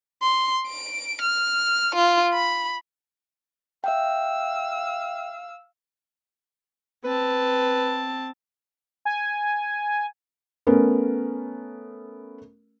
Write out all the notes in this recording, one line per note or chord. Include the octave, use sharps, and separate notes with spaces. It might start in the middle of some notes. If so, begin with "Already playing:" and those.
C6
D7
F6
F4
B5
E5 F5 G5 E6
C4 B4 A5
G#5
A3 B3 C#4 A#4